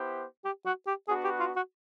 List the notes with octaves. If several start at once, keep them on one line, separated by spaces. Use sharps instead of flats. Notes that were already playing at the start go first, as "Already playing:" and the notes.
Already playing: B3 E4 G4 C5
G4
F#4
G4
B3 D4 F#4 G#4 B4
G4
F4
F#4